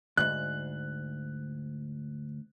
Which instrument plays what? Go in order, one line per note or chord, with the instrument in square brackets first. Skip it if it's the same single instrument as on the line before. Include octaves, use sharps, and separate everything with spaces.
[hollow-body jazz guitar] D2 G#2 [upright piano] F#6